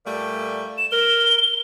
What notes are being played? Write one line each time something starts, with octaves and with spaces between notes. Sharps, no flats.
A#2 G3 A3
E7
A#4 G7